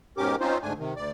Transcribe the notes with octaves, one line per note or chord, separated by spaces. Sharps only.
G#2 B2 C#4 G4 A#4 D6
C4 C#4 D#4 F4 C5
D2 G#2 A3 D4 G#5
C3 D#3
D2 D5